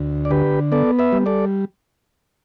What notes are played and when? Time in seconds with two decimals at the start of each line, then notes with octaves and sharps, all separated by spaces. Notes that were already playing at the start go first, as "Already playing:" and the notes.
Already playing: D2
0.25 D5
0.31 D3 G4 B4
0.72 B3 A4 D5
0.99 B4 E5
1.13 G3
1.26 A4 D5